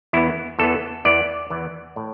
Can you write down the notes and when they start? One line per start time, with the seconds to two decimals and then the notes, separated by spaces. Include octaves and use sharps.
0.13 E2 E3 B3 E4
0.59 E2 E3 B3 A4
1.05 E2 E3 B3 D5
1.50 E2 E3 B3
1.96 A2